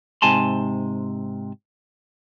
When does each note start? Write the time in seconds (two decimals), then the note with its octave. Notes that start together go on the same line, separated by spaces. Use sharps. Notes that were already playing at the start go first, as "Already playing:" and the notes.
0.22 G#2 C3 G#5 A5 C6